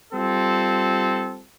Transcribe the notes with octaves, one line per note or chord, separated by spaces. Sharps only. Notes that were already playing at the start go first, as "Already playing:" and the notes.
G3 C4 F4 A4